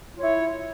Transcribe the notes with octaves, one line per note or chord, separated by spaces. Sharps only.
E4 F4 C#5